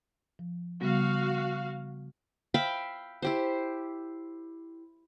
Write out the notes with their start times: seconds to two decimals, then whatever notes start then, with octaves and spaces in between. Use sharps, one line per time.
0.39 F3
0.81 C#3 G3 B3 F#4 F5
2.54 E5 F5 G5 B5
3.22 E4 G4 C5